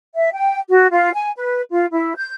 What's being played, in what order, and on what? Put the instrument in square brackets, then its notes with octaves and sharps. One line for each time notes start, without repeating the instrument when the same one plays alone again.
[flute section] E5
G5
F#4
F4
G#5
B4
F4
E4
G6